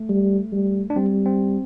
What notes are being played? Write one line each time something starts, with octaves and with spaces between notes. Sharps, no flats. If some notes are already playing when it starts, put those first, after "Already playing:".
Already playing: A3
G3
G3
D4
G3 C4
C4